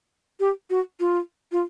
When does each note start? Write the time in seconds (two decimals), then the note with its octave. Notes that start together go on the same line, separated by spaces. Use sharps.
0.40 G4
0.70 F#4
1.00 F4
1.52 F4